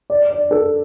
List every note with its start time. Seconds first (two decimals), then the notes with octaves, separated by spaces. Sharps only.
0.10 D5
0.30 D5
0.51 A4